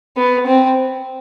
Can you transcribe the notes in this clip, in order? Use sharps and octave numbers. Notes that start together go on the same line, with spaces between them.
B3
C4